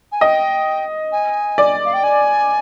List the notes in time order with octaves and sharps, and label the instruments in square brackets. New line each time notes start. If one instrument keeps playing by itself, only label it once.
[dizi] G#5
[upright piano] D#5 [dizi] G5
[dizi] G#5
[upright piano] D5
[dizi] F5
G5
G#5